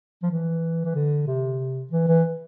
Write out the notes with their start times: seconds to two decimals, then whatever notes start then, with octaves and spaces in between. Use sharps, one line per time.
0.23 F3
0.30 E3
0.85 E3
0.95 D3
1.27 C3
1.91 E3
2.08 E3